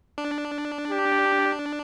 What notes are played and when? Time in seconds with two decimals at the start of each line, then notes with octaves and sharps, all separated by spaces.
0.18 D4
0.90 G4